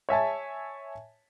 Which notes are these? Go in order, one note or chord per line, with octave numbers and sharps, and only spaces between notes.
C#5 E5 G#5 A5